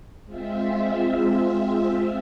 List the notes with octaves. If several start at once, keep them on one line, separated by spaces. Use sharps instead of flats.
G#3 C4 F4 E5